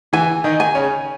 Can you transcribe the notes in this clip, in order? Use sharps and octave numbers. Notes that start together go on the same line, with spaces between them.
E3 E4 G#5
D#3 D#4
G#5
C#3 C#4